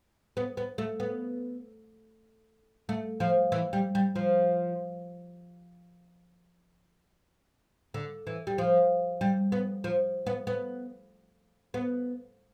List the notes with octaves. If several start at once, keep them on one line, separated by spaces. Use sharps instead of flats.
B3
B3
A3
B3
A3
F3
E3
G3
G3
F3
D3
E3
G3
F3
G3
B3
F3
B3
B3
B3